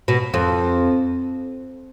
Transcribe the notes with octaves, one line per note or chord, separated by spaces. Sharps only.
B2
F2